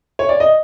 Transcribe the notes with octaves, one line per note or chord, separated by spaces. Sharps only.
C#5
D5
D#5